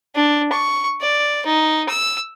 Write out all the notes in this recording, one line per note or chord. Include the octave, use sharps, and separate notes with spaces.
D4
C#6
D5
D#4
E6